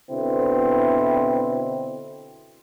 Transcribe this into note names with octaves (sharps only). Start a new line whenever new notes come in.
B2 D3 C4 E4